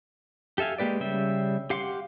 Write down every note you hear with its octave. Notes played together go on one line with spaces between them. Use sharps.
G4 A4 E5 F5 G#5
G#3 A#3 G4 B4 D5
C#3 G3 E5 G5
G4 F5 F#5 C6 D6